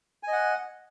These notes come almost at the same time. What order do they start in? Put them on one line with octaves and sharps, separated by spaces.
G#5 D#5 F#5